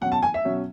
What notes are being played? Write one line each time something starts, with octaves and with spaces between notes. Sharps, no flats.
B2 F#3 C#4 F#5
A5
G#5
E5
B2 F#3 C#4